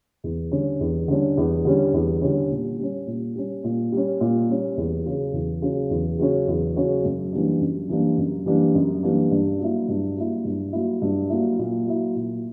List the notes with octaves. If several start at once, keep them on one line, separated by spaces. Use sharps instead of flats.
E2
D3 G3 C#4
E2
D3 G3 C#4
E2
D3 G3 C#4
E2
D3 G3 C#4
A#2
G3 C#4
A#2
G3 C#4
A#2
G3
C#4
A#2
G3 C#4
E2
C#3 F#3 C#4
E2
C#3 F#3 C#4
E2
C#3 F#3 C#4
E2
C#3 F#3 C#4
F#2
E3 G3 A#3 D4
F#2
E3 G3 A#3 D4
F#2
E3 G3 A#3 D4
F#2
E3 G3 A#3 D4
G2
F#3 A#3 E4
G2
F#3 A#3 E4
G2
F#3 A#3 E4
G2
F#3 A#3 E4
A#2
F#3 A#3 E4
A#2